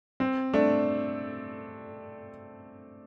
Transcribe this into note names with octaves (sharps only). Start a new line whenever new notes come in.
C4
A3 D4